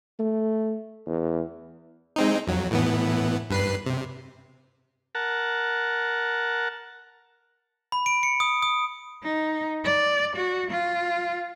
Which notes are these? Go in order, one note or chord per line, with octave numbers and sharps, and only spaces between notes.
A3
E2
G#3 C4 D#4
F2 F#3
A2 E3 B3
G2 B4 C7
C3
A#4 F#5 A5
B5
D7
C#7
D#6
D#6
D#4
D5
F#4
F4